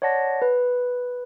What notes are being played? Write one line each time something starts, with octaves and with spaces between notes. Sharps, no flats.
C#5 D5 F#5 A5 A#6
B4